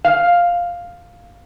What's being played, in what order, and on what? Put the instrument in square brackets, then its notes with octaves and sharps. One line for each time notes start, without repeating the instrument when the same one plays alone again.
[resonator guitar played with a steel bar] F5